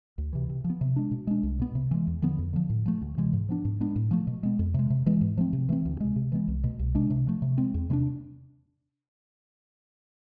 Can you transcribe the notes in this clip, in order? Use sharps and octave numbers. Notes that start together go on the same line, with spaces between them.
D2
C3 E3
C3
F3
B3
C3
G#3 D4
B2
G#3 D4
C2
B2 B3
C3
E3 G#3
E2
D3 F3 B3
F2
D3 F3
A2
F3 A3
D2
C3 E3 G#3
G#2
F3 B3 D4
G#2
G#3 B3 D4
A2
F3 A3
B2
G#3 B3
F2
C3 G#3
C3
E3 G#3 B3
G#2
F3 A3 C4
C3
E3 A3 C4
D2
C3 G#3
C3
E3 G#3 B3
C2
B2 A3
C2
C3 G#3 D4
C3
F3 A3
C3
G#3 C4
E2
C3 G#3 D4